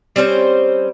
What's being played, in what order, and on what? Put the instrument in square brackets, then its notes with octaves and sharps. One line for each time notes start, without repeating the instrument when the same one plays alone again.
[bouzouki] G3 C4 C#4 C5